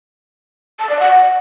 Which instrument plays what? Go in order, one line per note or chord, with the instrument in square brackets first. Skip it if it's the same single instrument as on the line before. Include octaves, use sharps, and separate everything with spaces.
[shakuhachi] A5
D5
F#5